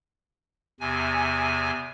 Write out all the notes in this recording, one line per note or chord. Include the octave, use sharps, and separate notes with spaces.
E2 C3 G#5